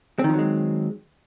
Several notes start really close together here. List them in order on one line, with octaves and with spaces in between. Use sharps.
C4 D#3 F3 F#3 G#3